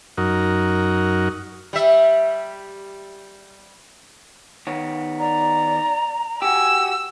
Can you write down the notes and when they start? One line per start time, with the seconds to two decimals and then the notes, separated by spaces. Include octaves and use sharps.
0.18 F#2 D#4 F#4 A#4
1.73 G3 E5
4.67 D#3 B3 C#5
5.19 D5 A#5
6.42 F#4 G4 G#5 E6